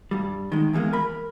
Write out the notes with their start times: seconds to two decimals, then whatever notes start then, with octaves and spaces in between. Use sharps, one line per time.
0.11 G2 G3
0.52 D#3 G#3
0.73 E2 E3 F#3 G#3 A#3
0.93 A#4 B5